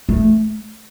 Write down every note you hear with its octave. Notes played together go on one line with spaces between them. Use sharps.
A3